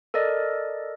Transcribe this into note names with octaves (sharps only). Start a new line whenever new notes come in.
A4 A#4 D5 D#5